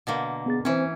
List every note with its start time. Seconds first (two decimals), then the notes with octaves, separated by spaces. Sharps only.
0.07 B2 D3 A#3
0.46 B3 G#4 A6
0.65 E3 C4 C#4 C5